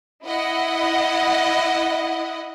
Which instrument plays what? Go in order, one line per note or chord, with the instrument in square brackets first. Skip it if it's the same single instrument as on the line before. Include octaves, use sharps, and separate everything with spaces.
[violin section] E4 D#5 F#5